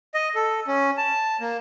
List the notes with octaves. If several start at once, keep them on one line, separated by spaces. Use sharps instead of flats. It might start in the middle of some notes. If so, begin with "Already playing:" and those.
D#5
A4
C#4
A5
A#3